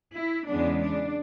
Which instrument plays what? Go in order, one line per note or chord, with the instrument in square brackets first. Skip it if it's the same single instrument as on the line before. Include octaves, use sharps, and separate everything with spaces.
[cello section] E4
E2 C#3 E3 G#3 B3 D4
D4